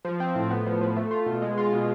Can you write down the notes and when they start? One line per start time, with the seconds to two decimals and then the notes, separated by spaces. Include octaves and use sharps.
0.05 F3
0.20 C4
0.35 A2
0.50 B3
0.66 F3
0.81 F3
0.96 A3
1.11 F4
1.26 B2
1.42 G#3
1.58 F4
1.73 B2